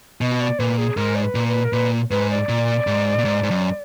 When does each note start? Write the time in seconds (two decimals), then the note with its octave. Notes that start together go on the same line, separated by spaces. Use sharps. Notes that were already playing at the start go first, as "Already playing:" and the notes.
0.21 B2 D#5
0.41 D5
0.59 A#2 B4
0.78 G#4
0.97 G#2 A#4
1.15 D5
1.23 B4
1.35 A#2
1.48 B4
1.65 A#4
1.73 A#2 B4
2.11 G#2 B4
2.31 D5
2.49 A#2
2.87 G#2
3.18 A#2
3.25 G#2
3.43 G#2
3.51 F#2